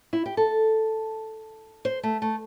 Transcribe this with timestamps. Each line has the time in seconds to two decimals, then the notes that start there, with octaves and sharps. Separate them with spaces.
0.13 E4
0.26 G4
0.37 A4
1.85 C5
2.03 A3
2.22 A3